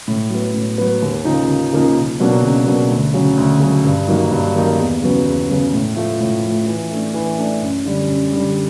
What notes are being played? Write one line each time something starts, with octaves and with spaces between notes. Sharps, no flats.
A2
F#3 B3
A2
F#3 B3
D#2
C#3 F3 A#3 D#4
D#2
C#3 F3 A#3 D#4
C#2
B2 F#3 A#3 D4
C#2
B2 F#3 A#3 D4
D2
C#3 F#3
D2
C#3 F#3
G2
D#3 F#3 A#3 D#4
G2
D#3 F#3 A#3 D#4
E2
C#3 F#3 B3
E2
C#3 F#3 B3
A2
F3 A3
A2
F3 A3
E3
A3 D4
E3
A3 D4
F#2
D3 G3
F#2
D3 G3